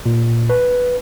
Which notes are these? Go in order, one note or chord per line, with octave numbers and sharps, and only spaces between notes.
A#2
B4